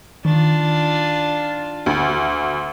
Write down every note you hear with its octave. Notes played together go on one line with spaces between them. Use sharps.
D#3 D4 F4
D2